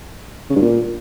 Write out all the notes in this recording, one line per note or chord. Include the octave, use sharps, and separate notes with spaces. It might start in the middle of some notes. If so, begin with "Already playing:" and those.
C#3
G2
A#2